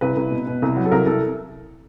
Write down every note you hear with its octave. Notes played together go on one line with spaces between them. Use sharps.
C2 B4
C2
B2
B2
C2
F#3
A4
C2 A#4
C2 A4